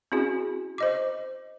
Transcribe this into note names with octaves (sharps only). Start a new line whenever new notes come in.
C4 C#4 E4 F#4 G#4
C5 D#5 D6